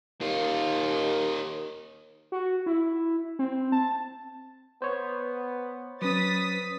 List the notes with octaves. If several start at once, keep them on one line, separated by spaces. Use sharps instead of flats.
D#2 D#3 F4
F#4
E4
C4
A5
B3 C5 C#5
F#3 C#4 B4 D#6 A6 B6